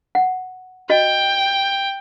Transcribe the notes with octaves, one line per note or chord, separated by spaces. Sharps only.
F#5
F#4 D#5 G5